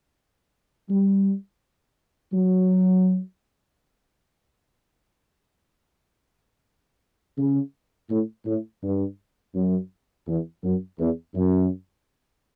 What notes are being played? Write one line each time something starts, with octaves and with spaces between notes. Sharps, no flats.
G3
F#3
C#3
A2
A2
G2
F#2
E2
F#2
E2
F#2